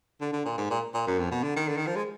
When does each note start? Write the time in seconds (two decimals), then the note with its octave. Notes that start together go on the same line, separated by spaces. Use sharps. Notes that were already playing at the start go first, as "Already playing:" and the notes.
0.21 D3
0.33 D3
0.45 A#2
0.58 G#2
0.70 A#2
0.94 A#2
1.07 F#2
1.19 F2
1.32 B2
1.44 D3
1.56 D#3
1.68 D3
1.77 D#3
1.87 F3
1.96 G#3